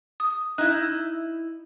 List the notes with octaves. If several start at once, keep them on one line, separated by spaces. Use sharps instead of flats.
D#6
D#4 E4 F#6